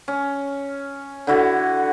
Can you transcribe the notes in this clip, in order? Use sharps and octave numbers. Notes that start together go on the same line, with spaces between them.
C#4
D3 E4 F#4